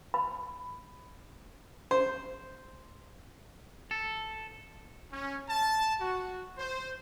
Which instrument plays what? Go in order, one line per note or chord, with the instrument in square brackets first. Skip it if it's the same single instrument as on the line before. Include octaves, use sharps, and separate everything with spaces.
[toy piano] B5
[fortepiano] C5
[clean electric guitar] A4
[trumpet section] C#4
A5
F#4
C5